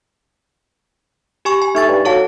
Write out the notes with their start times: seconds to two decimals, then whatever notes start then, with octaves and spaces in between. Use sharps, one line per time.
1.45 G4 G#5 C#6
1.62 G#5
1.75 A3 D#4 C#6 A6
1.89 G2
2.05 F#3 A4 F5 A5